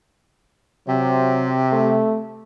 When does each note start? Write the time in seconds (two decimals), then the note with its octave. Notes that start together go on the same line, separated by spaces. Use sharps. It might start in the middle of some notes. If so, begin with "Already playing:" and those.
0.87 C3 F#3
1.72 A3